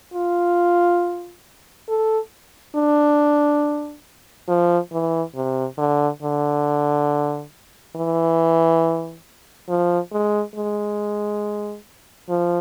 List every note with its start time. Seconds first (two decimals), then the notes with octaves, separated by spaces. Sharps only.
0.14 F4
1.89 A4
2.75 D4
4.48 F3
4.92 E3
5.35 C3
5.78 D3
6.22 D3
7.96 E3
9.69 F3
10.12 G#3
10.56 G#3
12.29 F3